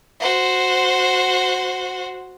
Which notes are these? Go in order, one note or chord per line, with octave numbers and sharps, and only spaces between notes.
F#4 C5